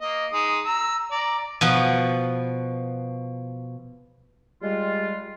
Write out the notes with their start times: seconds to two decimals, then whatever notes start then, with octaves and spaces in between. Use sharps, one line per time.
0.01 A#3 D#5
0.32 G#3 D#4 D#6
0.66 A#5 E6
1.12 D5 A#5
1.61 B2 F3 B3
4.62 G3 G#3 F4